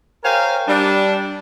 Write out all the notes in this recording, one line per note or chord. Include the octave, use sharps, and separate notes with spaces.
G4 A#4 C5 C#5 F5 G#5
G3 D4